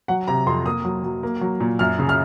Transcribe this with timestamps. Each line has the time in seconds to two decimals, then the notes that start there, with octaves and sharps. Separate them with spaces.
0.08 F#3 F#5
0.27 C3 A#5
0.46 F2 C6
0.65 A#3 D#6
0.85 F#3
1.04 F#3
1.23 A#3
1.41 F#3
1.60 A#2
1.79 F#2 F6
1.99 C#3
2.09 F6